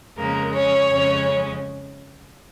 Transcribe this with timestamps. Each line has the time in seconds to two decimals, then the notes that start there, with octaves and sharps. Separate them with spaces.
0.17 F2 C#3 G#3 A#3 A#4
0.54 C#4 C#5
0.90 F2 C#3 G#3 C#4